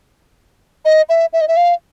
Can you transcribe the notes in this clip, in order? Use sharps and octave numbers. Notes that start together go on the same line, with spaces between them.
D#5
E5
E5
D#5
E5
F5